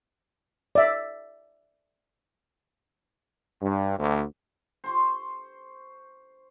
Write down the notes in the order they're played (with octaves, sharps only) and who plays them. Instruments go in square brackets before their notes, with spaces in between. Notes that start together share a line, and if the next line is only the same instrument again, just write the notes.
[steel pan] D5 E5
[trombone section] G2
D2
[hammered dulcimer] C5 C6 C#6